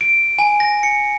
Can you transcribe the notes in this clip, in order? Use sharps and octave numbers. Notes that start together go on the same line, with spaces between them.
D7
G#5
A#6
C#7